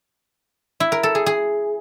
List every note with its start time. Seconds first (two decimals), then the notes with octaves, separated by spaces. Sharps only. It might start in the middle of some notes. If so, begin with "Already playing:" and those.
0.80 E4
0.92 A#4
1.03 A4
1.15 G#4
1.26 G#4